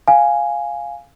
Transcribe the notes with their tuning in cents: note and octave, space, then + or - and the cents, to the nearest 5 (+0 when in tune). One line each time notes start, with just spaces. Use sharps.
F5 +0 G#5 +0